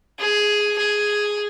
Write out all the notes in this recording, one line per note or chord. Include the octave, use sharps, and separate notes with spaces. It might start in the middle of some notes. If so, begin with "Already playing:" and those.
G#4
G#4